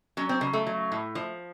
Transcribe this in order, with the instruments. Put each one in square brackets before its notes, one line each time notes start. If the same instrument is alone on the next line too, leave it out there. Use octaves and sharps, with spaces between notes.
[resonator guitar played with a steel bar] F#3 C#4
C4
C#3
A3
F#3
A2
F3